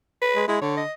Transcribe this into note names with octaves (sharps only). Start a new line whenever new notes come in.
B4
G#3
G#3 E4
D3 C#5
D#5